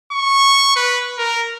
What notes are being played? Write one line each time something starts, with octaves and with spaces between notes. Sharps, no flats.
C#6
B4
A#4